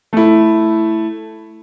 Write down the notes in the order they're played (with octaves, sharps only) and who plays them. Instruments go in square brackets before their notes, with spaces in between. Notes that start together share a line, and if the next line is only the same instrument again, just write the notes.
[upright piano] A3 E4